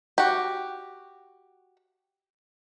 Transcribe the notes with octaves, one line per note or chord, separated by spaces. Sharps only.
F#4 G4